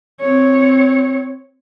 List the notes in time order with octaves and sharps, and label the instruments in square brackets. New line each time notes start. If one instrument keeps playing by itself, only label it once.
[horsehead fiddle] C4 C#5